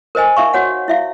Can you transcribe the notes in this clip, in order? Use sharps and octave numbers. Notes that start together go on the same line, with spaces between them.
A#4 C5 D#5 G#5
D#4 E5 F5 C#6
F#4 C#5 F#5
E4 E5 F5